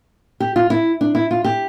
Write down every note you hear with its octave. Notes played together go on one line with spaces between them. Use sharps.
G4
F4
E4
D4
E4
F4
G4